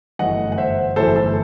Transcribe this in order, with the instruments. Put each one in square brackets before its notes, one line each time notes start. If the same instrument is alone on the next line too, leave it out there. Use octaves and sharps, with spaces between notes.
[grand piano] G1 F#2 E3 A3 D#5 F#5
F#5
C5 E5
G1 F#2 E3 A3 A4 C5
A4